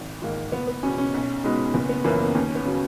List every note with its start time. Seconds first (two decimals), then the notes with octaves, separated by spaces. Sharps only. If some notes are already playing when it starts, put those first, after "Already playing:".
Already playing: G#1
0.22 G#2 D#3 A#3
0.52 F#1 B3
0.68 B3
0.83 E2 B2 C#4
0.98 C#4
1.14 B1
1.43 B2 G#3 B3 D#4
1.74 F#1 B3
1.89 B3
2.04 F#2 E3 A#3 B3
2.20 B3
2.35 D#2 C#4
2.55 B3
2.65 C#3 F#3